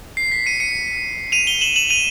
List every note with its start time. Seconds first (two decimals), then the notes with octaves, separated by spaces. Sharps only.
0.17 C7
0.32 B6
0.46 C#7 D#7
0.60 C#7 D#7
1.32 D#7 F7
1.47 F7 G7
1.61 E7 F#7
1.76 E7 F#7
1.90 D#7 F7